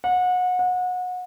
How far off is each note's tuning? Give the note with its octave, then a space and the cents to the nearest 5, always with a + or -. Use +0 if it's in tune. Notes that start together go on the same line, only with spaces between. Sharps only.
F#5 -30
F#5 -30